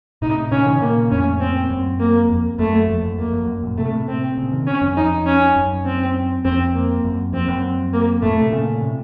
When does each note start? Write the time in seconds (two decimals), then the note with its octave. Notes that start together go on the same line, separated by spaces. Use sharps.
0.22 A2 C3 D#4
0.51 A#2 C#3 C#4
0.66 C3 D#3
0.81 A#2 C#3 A#3
1.11 F2 A2 C#4
1.41 C4
1.70 F#2
1.99 A#3
2.29 F2
2.59 F#2 A3
2.89 F2
3.03 F#2
3.19 F2 A#3
3.33 F#2
3.48 F#2
3.63 F#2 A#2
3.77 A2 C3 A3
3.92 A2 C3
4.08 C4
4.37 A#2 C#3
4.51 C3 D#3
4.67 C#4
4.81 F#2
4.97 F2 D#4
5.26 C#4
5.56 F#2
5.85 C4
6.45 F2 C4
6.75 A#3
7.04 F#2
7.33 F2 C4
7.48 F#2
7.93 A#3
8.22 F2 A2 A3
8.38 A2 C3
8.52 A#2 C#3
8.82 A2 C3